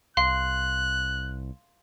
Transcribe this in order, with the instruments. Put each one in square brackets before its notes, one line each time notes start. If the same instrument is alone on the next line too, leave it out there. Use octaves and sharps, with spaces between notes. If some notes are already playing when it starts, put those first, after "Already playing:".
[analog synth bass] C2 [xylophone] F5 C6 [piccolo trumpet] F#6